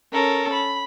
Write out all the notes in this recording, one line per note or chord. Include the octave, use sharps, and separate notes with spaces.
C#4 A4 A#4
B5